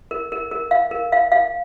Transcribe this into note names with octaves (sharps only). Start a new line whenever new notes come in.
A#4
A#4
A#4
F5
A#4
F5
F5